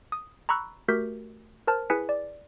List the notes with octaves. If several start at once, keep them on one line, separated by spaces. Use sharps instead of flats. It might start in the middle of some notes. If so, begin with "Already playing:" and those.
D#6
A#5 B5 C#6 E6 F#6
A3 F#4 G4 A#4 G6 B6
A#4 C5 A5 F6
E4 G#4 B4 G#5 B6 C#7
D5